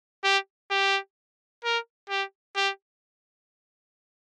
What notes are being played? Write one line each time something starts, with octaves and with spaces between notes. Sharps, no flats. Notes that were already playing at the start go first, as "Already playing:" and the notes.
G4
G4
A#4
G4
G4